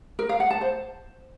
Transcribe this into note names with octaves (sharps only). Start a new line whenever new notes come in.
A#4
F5
F#5
A5
C5